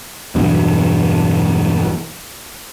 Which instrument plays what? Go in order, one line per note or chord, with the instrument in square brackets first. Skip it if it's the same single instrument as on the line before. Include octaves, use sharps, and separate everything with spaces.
[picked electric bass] B1 E2 G2 B2